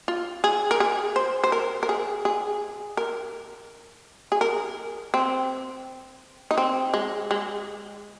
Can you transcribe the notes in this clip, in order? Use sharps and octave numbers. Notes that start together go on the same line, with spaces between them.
F4
G#4
A#4
G#4
C5
C5
A#4
A#4
G#4
G#4
A#4
G#4
A#4
C4
D#4
C4
G#3
G#3